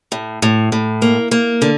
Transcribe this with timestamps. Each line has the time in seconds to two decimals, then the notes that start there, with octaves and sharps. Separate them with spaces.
0.12 A2
0.42 A2
0.72 A2
1.02 A#3
1.31 A#3
1.62 D3